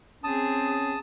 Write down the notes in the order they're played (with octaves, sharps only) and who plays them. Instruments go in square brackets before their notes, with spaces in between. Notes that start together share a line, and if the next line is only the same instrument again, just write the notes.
[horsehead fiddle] C4 G#4 [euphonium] C#4 [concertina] A5 D#6